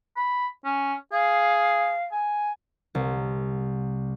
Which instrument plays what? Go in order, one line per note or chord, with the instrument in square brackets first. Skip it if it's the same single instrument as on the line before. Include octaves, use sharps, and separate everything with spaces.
[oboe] B5
C#4
[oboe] G#4 [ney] F5
[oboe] G#5
[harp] C2